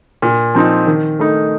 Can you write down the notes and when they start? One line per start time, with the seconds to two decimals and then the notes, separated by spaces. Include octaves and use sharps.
0.22 A#2
0.55 F3 C4 D#4
0.87 D#3
1.20 A3 D#4